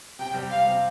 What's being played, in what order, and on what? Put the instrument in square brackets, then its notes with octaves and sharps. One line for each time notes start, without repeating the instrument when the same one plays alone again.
[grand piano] C3 [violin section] G5
[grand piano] G3 C4 G4
[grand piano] C3 [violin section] F5
[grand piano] G3 C4 G4